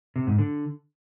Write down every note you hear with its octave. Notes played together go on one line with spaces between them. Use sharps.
C3
G#2
D3